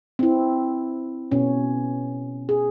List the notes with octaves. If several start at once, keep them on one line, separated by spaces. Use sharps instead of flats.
C4 E4
B2 C#4
G#4